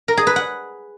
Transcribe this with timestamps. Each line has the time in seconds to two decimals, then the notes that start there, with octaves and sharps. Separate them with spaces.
0.08 A#4
0.17 G#4
0.27 B4
0.36 F#5